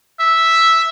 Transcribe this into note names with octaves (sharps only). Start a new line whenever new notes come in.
E5